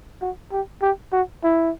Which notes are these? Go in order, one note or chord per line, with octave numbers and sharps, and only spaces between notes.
F#4
G4
G4
F#4
E4